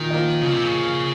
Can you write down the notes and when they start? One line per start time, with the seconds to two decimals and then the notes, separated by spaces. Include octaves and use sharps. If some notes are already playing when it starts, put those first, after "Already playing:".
Already playing: A#2 D#3
0.10 F3 A#3 D#4
0.42 A#2 C#3
0.53 C3
0.64 C#3